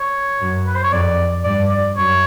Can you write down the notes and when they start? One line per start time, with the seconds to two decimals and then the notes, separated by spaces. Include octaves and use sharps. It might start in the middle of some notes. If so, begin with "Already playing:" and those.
Already playing: C#5
0.40 F#2
0.67 B4
0.75 C5
0.84 C#5
0.92 F2 D5
1.44 G2 D5
1.70 D5
1.96 F#2 C#5